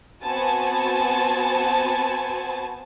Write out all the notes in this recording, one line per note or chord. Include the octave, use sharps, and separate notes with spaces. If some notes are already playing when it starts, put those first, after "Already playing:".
B3 C4 F#4 G#5 A5